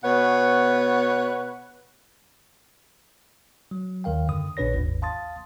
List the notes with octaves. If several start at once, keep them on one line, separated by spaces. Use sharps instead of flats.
B2 B4 C#5 F#5
F#3
D#2 D#3 A#4 F5 G5
F#2 D3 D#6
A#1 A#2 D4 B4 C#5 A#6
G1 D#2 G#2
F5 A5 C6 D#6 A6